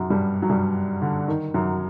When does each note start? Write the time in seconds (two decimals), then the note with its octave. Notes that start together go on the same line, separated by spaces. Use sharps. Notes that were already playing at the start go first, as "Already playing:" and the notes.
Already playing: F#2 F#3
0.10 G2 G3
0.42 F#3
0.50 G2 G3
1.02 D3
1.28 D#3
1.54 F#2 F#3